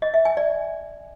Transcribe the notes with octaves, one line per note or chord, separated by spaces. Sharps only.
D#5
E5
G#5
D5